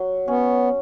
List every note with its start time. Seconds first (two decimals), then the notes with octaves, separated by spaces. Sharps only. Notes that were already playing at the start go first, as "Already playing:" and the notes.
Already playing: F#3
0.28 B3 C#4